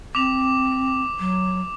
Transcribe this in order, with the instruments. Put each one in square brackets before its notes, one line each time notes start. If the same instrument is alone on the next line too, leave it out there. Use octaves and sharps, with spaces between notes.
[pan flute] C4 [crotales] D6 F7
[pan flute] F#3